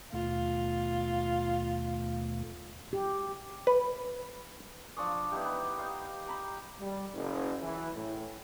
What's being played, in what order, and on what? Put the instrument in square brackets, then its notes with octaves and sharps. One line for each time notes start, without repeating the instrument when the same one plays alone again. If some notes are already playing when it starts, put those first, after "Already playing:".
[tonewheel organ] D#2 B2 A3 [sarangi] F4
[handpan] G4
[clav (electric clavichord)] B4
[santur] F3 D4 C#6 D#6
B3 D#4 E4 G4
B3
D#4 F5 C6
G5 A#5 B5
[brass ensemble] G3
F#1
E3
A2